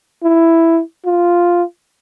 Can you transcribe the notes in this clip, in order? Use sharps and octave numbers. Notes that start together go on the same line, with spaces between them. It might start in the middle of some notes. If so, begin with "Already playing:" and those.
E4
F4